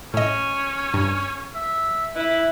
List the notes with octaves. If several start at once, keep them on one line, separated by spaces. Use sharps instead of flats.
A2 C#4 D#5
G2
E5
E4 B4